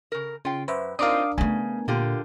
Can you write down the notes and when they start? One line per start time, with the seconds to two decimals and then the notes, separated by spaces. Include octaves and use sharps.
0.12 C#3 A#4
0.45 C#3 F4 G5
0.68 F#2 B4 C5 E5
0.99 C4 D4 D#4 F4 A#4 F5 D6 D#6
1.38 C#3 A3 B3 G#5
1.88 A#2 D3 F4 G4